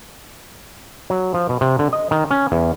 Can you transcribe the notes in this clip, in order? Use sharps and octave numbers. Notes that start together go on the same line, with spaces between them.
F#3
F3
B2
C3
D3
D#5
D#3
C#4
E2